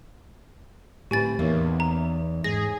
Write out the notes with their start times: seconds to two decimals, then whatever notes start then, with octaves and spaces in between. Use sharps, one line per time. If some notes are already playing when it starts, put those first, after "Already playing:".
1.11 D2 A2 C4 G4 B4 G#5 A6
1.39 E2 E3 A#3 B3 D#4 C#5 E5
1.80 A#5
2.44 G#2 G#4 A#6